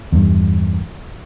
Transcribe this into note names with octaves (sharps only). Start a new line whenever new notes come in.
E2 G2